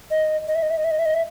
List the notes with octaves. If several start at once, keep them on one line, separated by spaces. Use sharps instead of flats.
D#5
D#5
E5
D#5
E5
D#5
E5
D#5
E5
D#5
E5